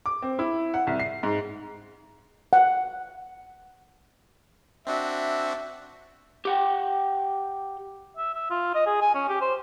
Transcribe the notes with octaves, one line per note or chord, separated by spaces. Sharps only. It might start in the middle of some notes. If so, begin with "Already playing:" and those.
D6
C4
E4
F#5
C2
C7
G#2
F#5
C4 D4 F#4 E5
G4 F#5 G5
E5
E5
F4
D#5
G#4
G#5
C#4
G4
C5